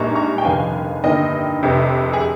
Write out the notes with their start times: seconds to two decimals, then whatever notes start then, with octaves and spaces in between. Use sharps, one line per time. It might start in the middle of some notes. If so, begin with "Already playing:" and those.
Already playing: A#1 G#2 G3 A#3 A#5 C#6
0.15 A#5 C#6
0.38 G5
0.45 F1 D#2 C#3 F3 F5 G#5
1.04 G1 G2 D#3 A#3 D#5 G5
1.63 F1 F2 C3
2.13 G#4